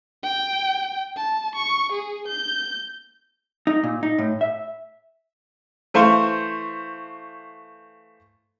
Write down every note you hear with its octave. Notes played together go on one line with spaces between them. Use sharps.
G5
A5
C#6
G#4
G6
D#4
A#2
D#4
A2
E5
E3 A3 C5 F5 C6 C#6